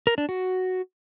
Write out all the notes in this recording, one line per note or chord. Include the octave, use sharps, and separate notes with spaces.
A#4
D4
F#4